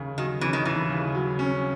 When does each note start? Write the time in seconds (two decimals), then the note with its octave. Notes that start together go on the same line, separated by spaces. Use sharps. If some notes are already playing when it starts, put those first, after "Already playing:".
Already playing: D#2 C#3
0.18 D#3 F#3
0.41 E3 C#4
0.53 D#3
0.65 D#2 E3
0.89 C#3
1.14 F#3
1.39 C#4